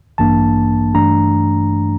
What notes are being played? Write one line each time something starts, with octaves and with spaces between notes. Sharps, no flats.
A1 G2 E3 A#3 D4 A5
G2 E3 A3 D4 A#5